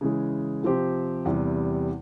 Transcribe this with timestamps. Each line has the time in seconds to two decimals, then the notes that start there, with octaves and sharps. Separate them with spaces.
0.01 C#3 E3 G#3
0.63 C3 F3 C4 G4 C5
1.25 E2 C3 E3 G3